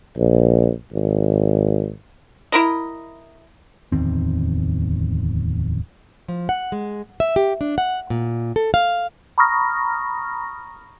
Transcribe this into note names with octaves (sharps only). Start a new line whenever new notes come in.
A#1
G#1
E4 A#4 D#5
D1 E2 D#3 C4
F3
F#5
G#3
E5
G4
D4
F#5
A#2
A4
F5
A#5 B5 C#6 D#6 F6 A#6